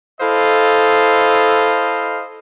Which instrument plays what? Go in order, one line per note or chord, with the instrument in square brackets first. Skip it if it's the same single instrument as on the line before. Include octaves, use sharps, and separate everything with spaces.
[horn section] E4 A4 C5 D#5 F5